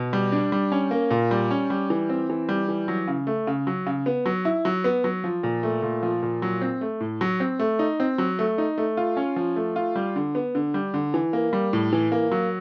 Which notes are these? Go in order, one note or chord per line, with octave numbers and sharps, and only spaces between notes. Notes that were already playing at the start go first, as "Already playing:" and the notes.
Already playing: B2
G3
D4
G3
C#4
A#3
A#2
G3
C#4
G3
E3
C4
E3
G3
E3
F#3
C#3
A3
C#3
F#3
C#3
B3
F#3
E4
F#3
B3
F#3
F3
A#2
A3
A#2
F3
A#2
F#3
C4
A3
A2
F#3
C4
A3
D#4
C4
F#3
A3
D#4
A3
F4
C#4
F3
A3
F4
G3
D3
B3
D3
G3
D3
E3
A#3
G3
A2
E3
A#3
F#3